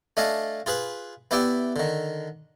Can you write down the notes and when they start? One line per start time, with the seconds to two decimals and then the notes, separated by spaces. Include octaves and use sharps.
0.17 A3 D4 D#5 F5 G#5 A5
0.66 F4 G#4 B4 B5
1.31 B3 E4 G4 D5 E5 G5
1.76 D3 D#3